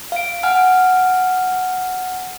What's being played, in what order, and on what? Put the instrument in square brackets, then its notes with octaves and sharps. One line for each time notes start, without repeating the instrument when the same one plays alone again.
[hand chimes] F5 D7
F#5 G#5 F6